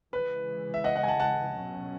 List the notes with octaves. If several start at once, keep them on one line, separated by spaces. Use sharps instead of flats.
C#3 E3 G#3 B4
E5
D#5 F#5
D#5 F#5
G#5
F#5 A5
F#5 A5
B2 F#3 C#4